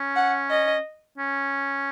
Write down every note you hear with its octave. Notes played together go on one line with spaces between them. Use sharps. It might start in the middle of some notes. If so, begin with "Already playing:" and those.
Already playing: C#4
F#5
D#5
C#4